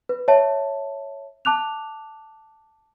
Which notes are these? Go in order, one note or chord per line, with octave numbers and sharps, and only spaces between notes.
B4
C#5 E5 A5
A5 D6 F#6 F7